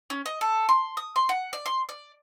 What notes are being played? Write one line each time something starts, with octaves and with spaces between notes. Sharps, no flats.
C#4
D#5
A4
C6
D#6
C6
F#5
D5
C6
D5